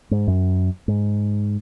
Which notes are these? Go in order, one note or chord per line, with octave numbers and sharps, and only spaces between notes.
G#2
F#2
G#2